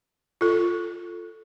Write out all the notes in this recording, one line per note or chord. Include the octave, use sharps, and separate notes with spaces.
F4 A4